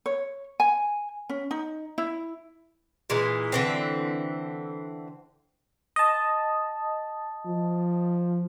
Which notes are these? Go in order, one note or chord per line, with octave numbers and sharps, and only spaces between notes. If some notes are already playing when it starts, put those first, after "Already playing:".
C#5
G#5
C#4
D#4
E4
A#2 E3 G#3
D3 E3 C4
D#5 A5
F3